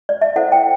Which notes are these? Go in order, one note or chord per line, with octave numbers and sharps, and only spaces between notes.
D5
E5
E4 A4 C5 F#5
G5